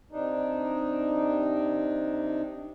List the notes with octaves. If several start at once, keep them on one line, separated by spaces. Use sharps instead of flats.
C3 D4 D#4